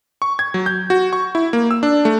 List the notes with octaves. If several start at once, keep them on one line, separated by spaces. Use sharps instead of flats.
C#6
G#6
F#3
G6
F#4
C#6
E4
A#3
E6
D4
A3